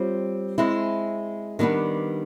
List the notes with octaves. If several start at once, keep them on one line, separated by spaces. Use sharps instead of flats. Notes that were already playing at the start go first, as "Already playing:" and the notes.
Already playing: G3 C4 F4 C#5
G#3 C4 E4
D#3 G3 B3 D4